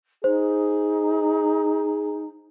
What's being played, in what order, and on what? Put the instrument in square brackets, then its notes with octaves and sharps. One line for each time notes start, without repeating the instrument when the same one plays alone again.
[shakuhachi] D#4 [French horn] G#4 [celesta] C5